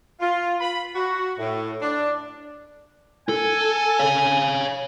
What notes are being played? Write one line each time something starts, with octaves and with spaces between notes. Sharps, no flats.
F4
B5
F#4
A2
D4
A4 G#5
C#5 F5